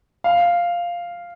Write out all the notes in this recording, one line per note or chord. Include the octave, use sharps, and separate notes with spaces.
F5